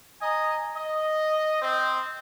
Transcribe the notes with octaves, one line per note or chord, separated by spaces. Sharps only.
D#5 G#5 A#5 D#6
D#5
C4 C5 D#5